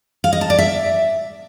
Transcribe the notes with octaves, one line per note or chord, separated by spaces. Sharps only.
F5
D#5
A5
D5
E5